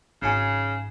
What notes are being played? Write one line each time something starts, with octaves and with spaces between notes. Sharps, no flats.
G#1 C#3 G#5